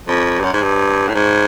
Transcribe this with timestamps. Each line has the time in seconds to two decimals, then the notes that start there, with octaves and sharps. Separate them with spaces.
0.08 F2
0.39 G2
0.44 F#2
0.53 G#2
0.62 G2
1.09 A2
1.15 G#2